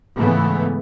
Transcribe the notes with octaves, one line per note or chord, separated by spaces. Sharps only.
G#2 C#3 E3 A3 B3